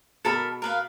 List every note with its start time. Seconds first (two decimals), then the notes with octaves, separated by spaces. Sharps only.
0.25 B2 A4 A#4 B5
0.62 A#4 B4 F5